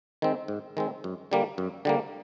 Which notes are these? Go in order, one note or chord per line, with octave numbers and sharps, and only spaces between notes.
D#3 G#3 C4
G#2
D#3 G#3 C4
F#2
D3 G3 A#3
F#2
D3 G3 A#3